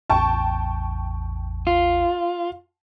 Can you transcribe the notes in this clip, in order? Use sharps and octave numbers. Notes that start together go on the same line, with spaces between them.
A1 E2 G5 A5 C#6
F4